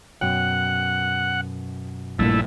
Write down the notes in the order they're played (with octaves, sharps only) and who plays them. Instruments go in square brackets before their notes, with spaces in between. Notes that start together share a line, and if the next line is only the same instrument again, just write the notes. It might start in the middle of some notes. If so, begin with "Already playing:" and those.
[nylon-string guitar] F#2 B2 G5 [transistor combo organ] F#5
[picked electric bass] A#1 G2 A#2 [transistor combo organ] A3 E4